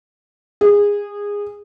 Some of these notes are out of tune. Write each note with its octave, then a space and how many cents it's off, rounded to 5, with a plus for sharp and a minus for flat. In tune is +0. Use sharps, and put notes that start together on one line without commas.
G#4 -20